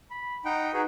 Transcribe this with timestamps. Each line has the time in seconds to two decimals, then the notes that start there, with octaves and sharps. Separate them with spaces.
0.11 B5
0.45 D#4 F#5 G5
0.73 D#4 F#4 G#4 B4